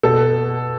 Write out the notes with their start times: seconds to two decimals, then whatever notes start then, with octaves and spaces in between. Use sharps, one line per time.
0.03 B2 A4